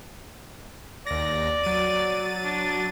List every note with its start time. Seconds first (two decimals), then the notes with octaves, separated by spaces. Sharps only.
1.07 D#2 D5 A#6
1.64 F#3 A6 D#7
2.44 D4